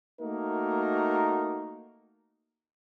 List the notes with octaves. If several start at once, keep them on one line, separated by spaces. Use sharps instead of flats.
A3 A#3 D#4 F#4 A#4